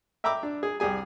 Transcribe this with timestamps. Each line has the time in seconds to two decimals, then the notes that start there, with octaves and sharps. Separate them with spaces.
0.24 E5 G5 A#5 B5 D6 E6
0.43 D4
0.63 G#4
0.80 C2 G4 G#4 G#5